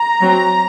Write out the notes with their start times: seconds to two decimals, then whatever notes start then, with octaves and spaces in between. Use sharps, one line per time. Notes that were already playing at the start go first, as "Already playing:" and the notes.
Already playing: A#5
0.21 F#3 C4